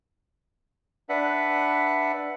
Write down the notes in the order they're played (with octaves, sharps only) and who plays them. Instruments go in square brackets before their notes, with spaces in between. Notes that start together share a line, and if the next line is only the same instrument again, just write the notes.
[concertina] D4 B4 E5 F#5 F#6